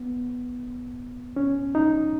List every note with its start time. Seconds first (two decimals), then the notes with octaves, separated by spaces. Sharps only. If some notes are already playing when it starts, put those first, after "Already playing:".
Already playing: B3
1.36 C#4
1.75 D#4